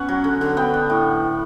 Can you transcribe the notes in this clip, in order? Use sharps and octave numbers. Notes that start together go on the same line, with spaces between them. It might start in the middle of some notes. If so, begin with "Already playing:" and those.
Already playing: B3 C#4 F#5
F#3
D3
D3
B3 G5
D4
A2